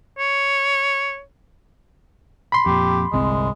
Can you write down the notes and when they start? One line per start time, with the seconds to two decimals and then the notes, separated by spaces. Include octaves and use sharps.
0.18 C#5
2.52 B5 C6
2.66 F2 A#2 G4
3.12 G1 C2 G#3 C4